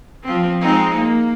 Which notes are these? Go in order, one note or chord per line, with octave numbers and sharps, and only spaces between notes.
F3 C4
G#3 C4 D#4
A#3